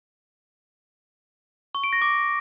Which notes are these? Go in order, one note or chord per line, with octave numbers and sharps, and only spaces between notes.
C#6
D7
A#6
D6